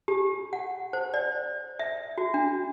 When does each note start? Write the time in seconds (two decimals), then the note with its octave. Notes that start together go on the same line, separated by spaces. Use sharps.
0.08 G4
0.53 F#5
0.93 C5
1.14 D5
1.79 E5
2.18 F#4
2.34 D4